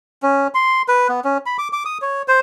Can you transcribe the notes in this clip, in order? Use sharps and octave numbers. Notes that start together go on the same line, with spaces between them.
C#4
C6
B4
B3
C#4
B5
D6
D6
D#6
C#5
C5